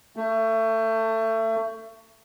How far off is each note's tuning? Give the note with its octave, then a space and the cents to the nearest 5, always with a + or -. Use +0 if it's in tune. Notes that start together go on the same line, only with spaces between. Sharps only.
A3 +25